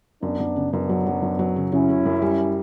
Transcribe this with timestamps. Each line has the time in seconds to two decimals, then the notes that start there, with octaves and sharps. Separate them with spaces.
0.23 F#2 B3 D4
0.40 F#2
0.56 C#3
0.73 F#2 B3 D4
0.89 F#3
1.06 F#3
1.22 F#2
1.39 F#3
1.56 C#3
1.72 C#3 C#4 E4
1.89 C#3
2.06 F#2
2.22 G3